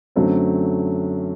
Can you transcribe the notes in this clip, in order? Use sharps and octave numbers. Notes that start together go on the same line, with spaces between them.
F#2 D3 F#3 A3 C4